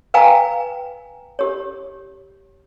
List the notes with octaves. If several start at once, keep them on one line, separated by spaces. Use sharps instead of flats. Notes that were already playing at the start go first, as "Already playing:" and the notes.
B4 F5 G5 G#5 A#5
G4 C#5